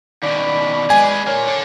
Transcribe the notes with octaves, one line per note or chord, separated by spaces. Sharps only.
D#2 B2 D5 B5
G#3 G#4 B4 G#5
A#2 A#3 C#5
D4 A4